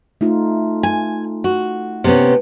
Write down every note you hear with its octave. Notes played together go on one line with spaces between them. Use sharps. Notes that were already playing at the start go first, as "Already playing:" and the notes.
A3 D#4 F4
G#5
F#4
C3 B3 C#4